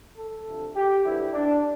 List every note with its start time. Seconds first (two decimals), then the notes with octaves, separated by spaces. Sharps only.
0.17 A4
0.46 D2 C3 F3
0.76 G4
1.04 D2 D3 F3 B3 E4
1.33 D4